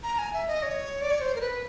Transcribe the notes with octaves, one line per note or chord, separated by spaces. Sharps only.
A#5
G#5
E5
D#5
C#5
D5
C#5
C5
A#4
B4